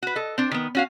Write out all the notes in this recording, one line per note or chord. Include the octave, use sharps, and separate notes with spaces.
F#4 B4
A4 D#5
C4 D4
D#3 B3
C#4 F#4 F5